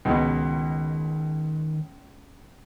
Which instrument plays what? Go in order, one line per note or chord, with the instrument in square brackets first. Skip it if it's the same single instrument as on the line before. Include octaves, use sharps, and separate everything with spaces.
[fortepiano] C#2 B2 [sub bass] D#3